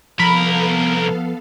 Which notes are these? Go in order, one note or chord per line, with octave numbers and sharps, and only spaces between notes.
C2 F3 B3 A4 A#4 F5 A#5 B5